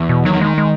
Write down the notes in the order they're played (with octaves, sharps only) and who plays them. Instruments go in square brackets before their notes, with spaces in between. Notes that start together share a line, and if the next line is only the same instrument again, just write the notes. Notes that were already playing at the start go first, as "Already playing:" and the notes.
Already playing: [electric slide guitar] E2
[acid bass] B2
[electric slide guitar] D#3 [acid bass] F#3
[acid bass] G#3
G#3